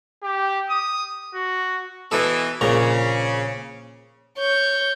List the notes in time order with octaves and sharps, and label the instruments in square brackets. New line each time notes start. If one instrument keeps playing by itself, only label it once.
[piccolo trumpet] G4
D#6
F#4
[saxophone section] B2 E3 [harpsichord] A4 B4
[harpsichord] A#1 A#2 A#5 [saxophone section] C#3
[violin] C#5 G6